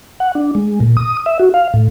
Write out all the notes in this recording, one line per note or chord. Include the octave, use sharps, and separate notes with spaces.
F#5
D4
G#3
A#2
D#6
E5
F#4
F5
A2